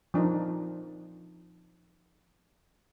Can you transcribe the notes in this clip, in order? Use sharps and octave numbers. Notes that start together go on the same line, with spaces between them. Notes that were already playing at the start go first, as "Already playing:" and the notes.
F3 D4 D#4 A#4